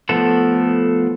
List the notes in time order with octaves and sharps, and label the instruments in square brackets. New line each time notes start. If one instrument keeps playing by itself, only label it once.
[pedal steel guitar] F3 A3 B3 A4